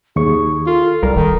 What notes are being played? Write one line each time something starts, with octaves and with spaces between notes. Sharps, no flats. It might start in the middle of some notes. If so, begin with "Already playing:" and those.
D#2 G#4 C#6
F4 A4
C2 G3 A4 A#4
D#1 D#3